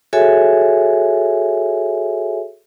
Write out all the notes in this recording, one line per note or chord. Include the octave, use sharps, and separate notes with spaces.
F#4 G#4 A4 C#5 E5 G#5